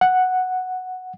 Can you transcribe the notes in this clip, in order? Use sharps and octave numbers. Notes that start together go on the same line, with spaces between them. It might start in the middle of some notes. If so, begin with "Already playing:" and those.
F#5